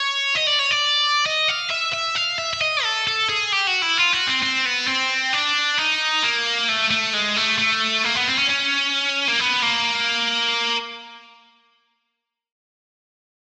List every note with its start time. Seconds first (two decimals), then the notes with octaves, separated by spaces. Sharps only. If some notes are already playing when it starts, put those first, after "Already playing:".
Already playing: C#5
0.35 D#5
0.47 D5
0.59 C#5
0.71 D5
1.26 D#5
1.49 F5
1.71 E5
1.94 E5
2.16 F5
2.38 E5
2.53 E5
2.61 D#5
2.84 A4
3.07 A4
3.29 G#4
3.52 G4
3.67 F#4
3.82 E4
3.97 F4
4.13 F#4
4.27 C4
4.42 C4
4.65 B3
4.87 C4
5.33 D4
5.78 D#4
6.23 A#3
6.68 A3
6.91 A3
7.14 G#3
7.36 A3
7.59 A3
8.05 A#3
8.16 B3
8.27 C4
8.39 C#4
8.50 C#4
9.28 A#3
9.40 B3
9.62 A#3